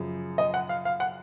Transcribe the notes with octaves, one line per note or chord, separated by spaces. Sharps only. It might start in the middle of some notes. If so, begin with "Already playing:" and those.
Already playing: F#2 C#3 F3
D#5
F#5
F5
F5
F#5